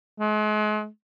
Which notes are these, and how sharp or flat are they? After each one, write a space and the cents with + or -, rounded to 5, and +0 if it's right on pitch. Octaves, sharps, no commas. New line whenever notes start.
G#3 +40